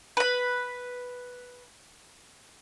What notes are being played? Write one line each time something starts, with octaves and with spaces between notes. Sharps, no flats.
B4 B5